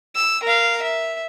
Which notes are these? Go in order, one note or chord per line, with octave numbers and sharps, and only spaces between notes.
E6
A#4 F5
E5